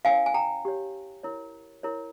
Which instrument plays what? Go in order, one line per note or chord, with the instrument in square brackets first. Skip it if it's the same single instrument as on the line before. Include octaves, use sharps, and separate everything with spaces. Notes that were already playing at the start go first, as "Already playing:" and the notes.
[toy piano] C#4 E4 A#4 C#5 F5 G#5
G#5
G5 A#5
G4 C#5
E4 A#4 C#5
E4 A#4 C#5